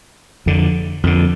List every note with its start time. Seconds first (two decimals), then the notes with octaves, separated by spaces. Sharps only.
0.46 F2 D3
1.03 F2 D3